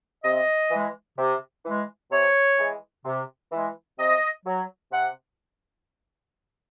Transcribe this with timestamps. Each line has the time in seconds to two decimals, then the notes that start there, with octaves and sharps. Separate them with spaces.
0.24 C3 D#5
0.71 E3 G#3
1.18 C3
1.65 E3 G#3
2.11 C3 C#5
2.58 E3 G#3
3.05 C3
3.52 E3 G#3
3.98 C3 D#5
4.46 F#3
4.92 C3 F#5